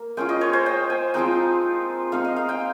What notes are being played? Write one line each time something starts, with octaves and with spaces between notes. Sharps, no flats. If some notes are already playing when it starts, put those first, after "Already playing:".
Already playing: A#3
G#3 C#4 F4 G5
D#5
C#5
C5
G5
G#5
F3 G#3 C4 D#4 G5
G#3 C4 D#4 F5
D#5
F5
G5